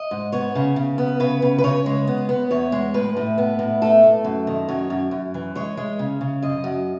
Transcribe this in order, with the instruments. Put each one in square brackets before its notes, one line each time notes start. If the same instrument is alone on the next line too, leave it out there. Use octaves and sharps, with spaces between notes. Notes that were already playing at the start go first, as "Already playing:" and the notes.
Already playing: [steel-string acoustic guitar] D#5
G#2
B3 C#5
C#3
C#3
B3
C#3 B4
C#3
B4
C#3 C#5
G#3
B3
B3
E2 C#5
G#3
A2 B4
A2
B3
A2
A3 A4
A3
F#2
D#3
F#2 C#5
F#2
F#2
E3
G#3 C#5
G#3
C#3
C#3
F#2 D#5
F#2